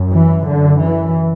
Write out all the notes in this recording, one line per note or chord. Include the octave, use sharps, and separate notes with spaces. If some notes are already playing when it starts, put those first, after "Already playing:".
Already playing: F#2
E3
F#2 D3
E3